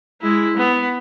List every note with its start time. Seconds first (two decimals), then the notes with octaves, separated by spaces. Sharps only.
0.21 G#3 E4
0.57 B3